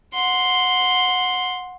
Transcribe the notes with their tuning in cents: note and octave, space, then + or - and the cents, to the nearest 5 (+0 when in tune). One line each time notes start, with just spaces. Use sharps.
F#5 -20 C6 +0